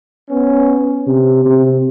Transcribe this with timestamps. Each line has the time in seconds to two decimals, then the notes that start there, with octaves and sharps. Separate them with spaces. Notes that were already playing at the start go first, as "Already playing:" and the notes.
0.30 B3 C#4
1.07 C3
1.45 C3